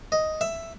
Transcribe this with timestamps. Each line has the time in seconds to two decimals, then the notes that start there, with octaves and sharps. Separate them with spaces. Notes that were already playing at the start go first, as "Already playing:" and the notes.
0.12 D#5
0.41 E5